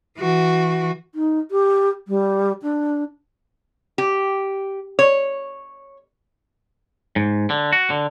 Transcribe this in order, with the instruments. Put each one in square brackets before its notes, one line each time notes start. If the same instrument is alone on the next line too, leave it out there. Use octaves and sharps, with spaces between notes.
[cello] E3 F#4
[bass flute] D#4
G4
G3
D4
[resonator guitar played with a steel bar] G4
C#5
[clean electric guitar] G#2
D3
F#4
D3